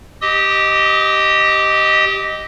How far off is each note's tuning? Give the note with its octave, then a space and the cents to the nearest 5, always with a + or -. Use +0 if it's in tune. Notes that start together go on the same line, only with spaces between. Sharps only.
G4 -10 D#5 +0 D#6 +35